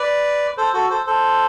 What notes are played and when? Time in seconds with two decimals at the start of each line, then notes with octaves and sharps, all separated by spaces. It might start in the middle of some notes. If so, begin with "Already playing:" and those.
Already playing: B4 D5
0.57 A4 C5
0.74 F#4 A4
0.90 A4 C5
1.06 A4 C5